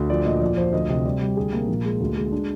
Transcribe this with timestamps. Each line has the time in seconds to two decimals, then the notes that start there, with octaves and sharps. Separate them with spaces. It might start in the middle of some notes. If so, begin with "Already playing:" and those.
Already playing: D2
0.10 F3 D5
0.26 A#2 D#5
0.41 F2 D5
0.57 F3 C5
0.73 D2 D#5
0.89 C3 D#5
1.05 G3 D5
1.22 G3
1.37 D2 G#4
1.53 C3 A#3
1.68 A#1
1.85 G#3
2.01 D2
2.17 G#3
2.32 D4